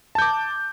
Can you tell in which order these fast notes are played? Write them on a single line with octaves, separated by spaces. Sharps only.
A5 G6 D6